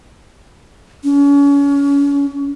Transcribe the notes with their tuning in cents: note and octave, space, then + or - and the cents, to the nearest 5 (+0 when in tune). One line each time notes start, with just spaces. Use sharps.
C#4 +35